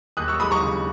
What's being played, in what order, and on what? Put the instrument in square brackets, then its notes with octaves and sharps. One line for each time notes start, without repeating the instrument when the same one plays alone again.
[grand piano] D#2 D#6 F#6
C#6 E6
G#3 B5 D#6
A#5 C#6
C#3